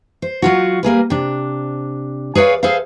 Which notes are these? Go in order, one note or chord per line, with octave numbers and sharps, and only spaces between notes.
C5
F#3 F4 F#4
G3 A#3 G#4 B4
C3 D4
G#4 B4 C#5 D5 F5
G#4 A4 B4 C5 F5